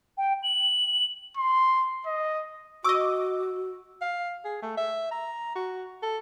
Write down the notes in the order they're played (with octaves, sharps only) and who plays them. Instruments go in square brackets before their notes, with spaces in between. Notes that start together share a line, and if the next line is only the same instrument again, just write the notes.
[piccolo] G5
F#7
[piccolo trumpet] C6
D#5
[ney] F#4 [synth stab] D#5 D6 [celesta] C#6 E6
[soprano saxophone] F5
G#4
A3
E5
A#5
F#4
A4